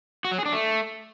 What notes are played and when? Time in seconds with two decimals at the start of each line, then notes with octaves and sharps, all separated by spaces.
0.25 F#4
0.32 F#3
0.39 G#4
0.46 D4
0.53 A3